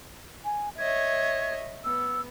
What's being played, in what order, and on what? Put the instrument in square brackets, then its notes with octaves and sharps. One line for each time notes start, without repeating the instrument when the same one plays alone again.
[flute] G#5
[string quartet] C#5 D#5 E5 [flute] G#6
[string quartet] B3 [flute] E6